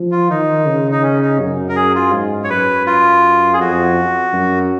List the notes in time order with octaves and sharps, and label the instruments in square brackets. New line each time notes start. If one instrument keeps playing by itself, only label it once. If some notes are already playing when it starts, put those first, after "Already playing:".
Already playing: [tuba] F3
[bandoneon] F4
[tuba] D#3 [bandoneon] D#4
[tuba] C#3
[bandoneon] D#4
C#4
D#4
[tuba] F#2
[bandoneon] A#4
G#4
F4
[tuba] G#2
[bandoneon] C#5
[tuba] F#2 [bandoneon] B4
[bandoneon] F4
G#4
[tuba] F2 [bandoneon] F#4
[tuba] F#2